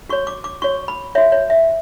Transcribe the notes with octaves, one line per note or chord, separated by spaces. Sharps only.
F#4 C#5 C#6
D6
D6
F#4 C#5 C#6
B5
F#4 C#5 E5
C#5
E5